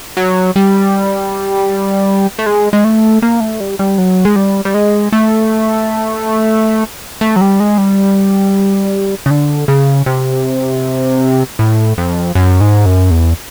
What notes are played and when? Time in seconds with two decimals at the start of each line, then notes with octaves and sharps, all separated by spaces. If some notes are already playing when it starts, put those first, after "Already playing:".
0.17 F#3
0.56 G3
2.39 A3
2.46 G#3
2.73 G#3
2.84 A3
3.22 A#3
3.40 A3
3.60 G3
3.79 G3
3.98 F#3
4.25 G#3
4.36 G3
4.65 G3
4.74 G#3
5.12 A3
7.21 A3
7.36 F#3
7.41 G3
7.60 G#3
7.78 G3
9.26 C#3
9.30 D3
9.68 C#3
10.06 C3
11.59 A2
11.98 F2
12.35 F#2
12.61 G#2
12.86 F#2
13.11 E2